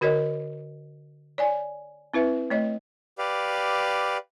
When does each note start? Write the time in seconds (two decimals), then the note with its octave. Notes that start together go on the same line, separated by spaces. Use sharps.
0.01 D3 F#4 A#4 C#5 D#5
1.38 C#5 D5 G#5
2.14 C4 E4 B4 E5
2.50 A3 C#5 D#5
3.18 G4 B4 D5 F5